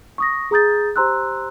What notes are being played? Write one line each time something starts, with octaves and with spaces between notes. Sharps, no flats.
C#6 D#6 A#6
G#4 A#5 D#6 G6 A6
G4 C5 A#5 C6 E6 F#6